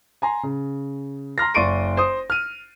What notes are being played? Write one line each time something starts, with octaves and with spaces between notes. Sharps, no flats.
G#5 A#5 C6
C#3
A#5 C6 F6 A#6
F#1 D5 C6 C#6 D7 D#7
C5 D#6
F6 D#7